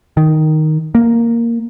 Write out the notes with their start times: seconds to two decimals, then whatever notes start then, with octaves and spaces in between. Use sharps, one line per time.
0.17 D#3
0.95 A#3